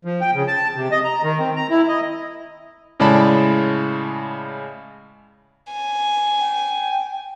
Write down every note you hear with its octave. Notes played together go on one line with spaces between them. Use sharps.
F3
G5
C#3
A5
C3
D#5
A#5
D#3
C4
A#5
E4
D#5
A2 C#3 G#3 D5 A5 B5
G#5
G5